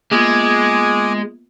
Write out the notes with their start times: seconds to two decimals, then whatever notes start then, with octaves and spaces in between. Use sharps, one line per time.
0.11 G#3 A#3 B3 F4 G#5 D6 D#6